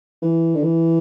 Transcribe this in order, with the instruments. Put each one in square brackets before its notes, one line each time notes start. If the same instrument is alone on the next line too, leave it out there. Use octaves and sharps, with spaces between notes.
[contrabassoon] E3
D3
E3